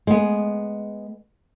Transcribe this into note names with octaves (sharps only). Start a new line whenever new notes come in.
G#3 B3